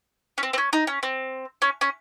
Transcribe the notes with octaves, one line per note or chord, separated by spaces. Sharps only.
C#4
C4
C4
C#4
D#4
C#4
C4
C#4
C#4